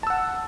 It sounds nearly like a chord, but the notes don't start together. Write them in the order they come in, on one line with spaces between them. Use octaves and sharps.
A5 E6 F#5